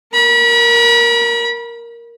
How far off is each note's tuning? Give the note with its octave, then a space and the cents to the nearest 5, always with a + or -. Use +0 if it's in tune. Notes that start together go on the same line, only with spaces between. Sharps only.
A#4 +0 B5 -35